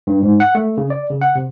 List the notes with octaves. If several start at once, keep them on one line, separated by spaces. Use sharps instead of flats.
G2
G#2
F#5
A3
C#3
D5
C#3
F#5
C3